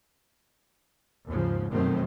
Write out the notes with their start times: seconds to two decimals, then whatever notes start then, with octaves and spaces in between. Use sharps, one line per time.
1.27 D#2 G#2 C#3 F3
1.70 F1 F#2 B2 D#3 A3 C4